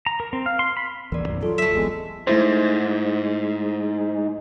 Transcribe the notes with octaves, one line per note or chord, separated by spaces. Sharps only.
A#5
A#4
C4
F5
C6
B5
A1 D#2 E3 A#4 D5
B1 F#2
F#3 F4 A4
A3 E5
D1 A1 G#3 B3
G#2 A3 E4 C5